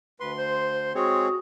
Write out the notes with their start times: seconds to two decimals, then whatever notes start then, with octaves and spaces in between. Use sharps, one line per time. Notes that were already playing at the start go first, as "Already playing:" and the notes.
0.20 D2 B4 C6
0.38 C5
0.95 G#3 C4 F#4 G#4 C#5 D#6